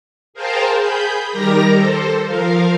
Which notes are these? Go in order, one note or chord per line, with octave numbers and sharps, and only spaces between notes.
G#4 A#4 C5 F5 G5 A5
G#4 B5 G6
D#3 G3 G4 A#4 A#5 A#6
A4 C5
F3 A#4 F5